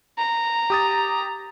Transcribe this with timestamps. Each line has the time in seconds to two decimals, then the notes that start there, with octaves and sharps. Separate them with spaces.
0.18 A#5
0.70 G4 D#6 A6